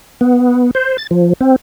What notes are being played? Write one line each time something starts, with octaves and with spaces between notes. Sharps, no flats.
B3
C5
A6
F3
C4